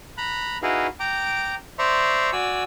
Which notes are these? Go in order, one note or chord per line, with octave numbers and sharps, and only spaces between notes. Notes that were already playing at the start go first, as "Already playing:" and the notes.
A#5 B5 F#6
D#4 E4 F#4 G#4 B4 F5
G5 A#5 D6
C5 D5 E5 A#5 C6 C#6
F#4 D5 G#5 E6